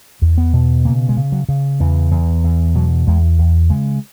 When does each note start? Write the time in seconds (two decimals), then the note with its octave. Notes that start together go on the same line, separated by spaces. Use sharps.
0.22 E2
0.38 B3
0.53 B2
0.85 C#3 A#3
1.09 G#3
1.17 C#3
1.32 F#3
1.49 C#3
1.80 E2 E3
2.11 E2
2.44 E2
2.75 B2 F#3
3.07 E2 G#3
3.39 E2
3.70 C#3 G#3